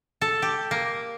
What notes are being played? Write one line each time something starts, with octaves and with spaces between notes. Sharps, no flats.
A4
G4
A#3